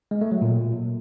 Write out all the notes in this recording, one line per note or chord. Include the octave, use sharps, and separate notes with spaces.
G#3
A3
F#3
A#2